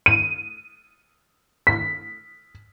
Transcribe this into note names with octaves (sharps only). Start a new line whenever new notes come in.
D#7
B6